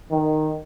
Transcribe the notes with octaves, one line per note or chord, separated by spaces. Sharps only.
D#3